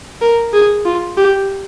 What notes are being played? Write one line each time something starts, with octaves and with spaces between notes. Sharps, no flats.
A#4
G#4
F4
G4